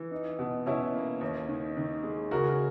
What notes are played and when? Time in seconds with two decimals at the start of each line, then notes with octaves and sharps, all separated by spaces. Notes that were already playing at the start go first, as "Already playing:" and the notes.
Already playing: E3
0.11 D#4
0.39 B2
0.66 B2 C#4 E4
0.94 A#3
1.21 D#2
1.49 D#3
1.77 D#3
2.03 G#3
2.31 C#3 F#4 A#4